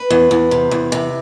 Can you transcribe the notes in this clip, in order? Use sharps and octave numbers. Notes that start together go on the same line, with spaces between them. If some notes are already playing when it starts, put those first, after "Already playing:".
Already playing: B4
E2
E2
C3
E2
C3